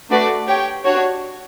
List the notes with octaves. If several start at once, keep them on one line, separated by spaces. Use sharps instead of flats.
A3 D4 F#4 B4 D5
G4 C#5 G5
D4 F#4 C#5